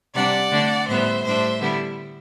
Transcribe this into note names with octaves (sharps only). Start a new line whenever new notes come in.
C3 G3 D4 D5 F#5
D3 A3 D4
A2 G3 B3 C5 E5
A2 G3 D4 C5 E5
D3 G3 B3 E4